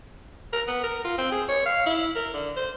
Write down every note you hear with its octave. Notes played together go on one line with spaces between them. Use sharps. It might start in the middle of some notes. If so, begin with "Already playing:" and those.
A#4
B3
A#4
F4
C4
G#4
C#5
F5
E4
A#4
D3
C5